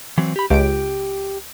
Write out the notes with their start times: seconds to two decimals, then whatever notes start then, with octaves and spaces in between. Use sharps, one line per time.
0.18 E3 F#3 C4
0.36 G4 B5
0.50 C#2 G4 D7